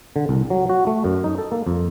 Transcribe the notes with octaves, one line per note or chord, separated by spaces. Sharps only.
D3
C2
F#3
F#4
A3
F#2
D#4
A4
A#3
F2